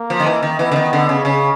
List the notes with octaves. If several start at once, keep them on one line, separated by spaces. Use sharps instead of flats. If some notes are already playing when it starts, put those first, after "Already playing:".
Already playing: A#3
F3
D#3
E3
D#3
E3 B3
D3
D#3
D3
C#3
C#3 C#4